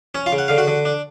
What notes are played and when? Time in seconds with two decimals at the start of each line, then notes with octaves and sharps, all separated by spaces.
0.15 C#4 C#5
0.26 F4 F5
0.32 C#3
0.38 F#5
0.48 D3 F5
0.58 F#4 F#5
0.68 D3
0.85 D4